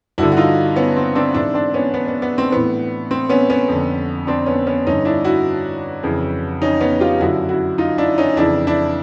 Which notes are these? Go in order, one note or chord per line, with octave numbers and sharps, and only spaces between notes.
G2 D3 E4 F#4
F#4
D#4 F4
B3 C#4
C4
C4 D4
G#2 E3 D4 E4
C4 D4
B3 C#4
B3
B3
B3
C4
A2 E3 B3
C4
B3 C#4
B3 C#4
F2 D3
C4 D4
B3 C#4
B3 C#4
G2 D3 C#4 D#4
D4 E4
E4 F#4
F2 C#3 E3
C#4 D#4
B3 C#4
F4 G4
F#2 D3 E4 F#4
E4 F#4
D#4 F4
D4 E4
C#4 D#4
F2 C#3 E3 D4 E4
D4 E4